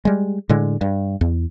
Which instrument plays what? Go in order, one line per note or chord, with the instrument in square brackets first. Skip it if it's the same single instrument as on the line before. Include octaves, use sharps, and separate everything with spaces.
[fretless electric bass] G3 G#3
A2 D3 G#3
G2
E2